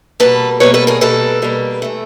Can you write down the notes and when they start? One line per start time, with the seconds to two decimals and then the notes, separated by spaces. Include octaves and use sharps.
0.20 B2 G3 A#3 A4 B4
0.60 B2 G3 A#3 B4 C#5
0.74 A4 B4
0.87 G#4 A#4
1.01 B2 G3 A#3 A4 B4
1.42 B2 G3 A#3
1.82 E3 A3